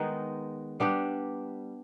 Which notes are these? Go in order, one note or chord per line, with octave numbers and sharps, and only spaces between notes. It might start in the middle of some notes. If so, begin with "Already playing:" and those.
Already playing: D#3 G#3 B3 D#4
G3 B3 D4 G4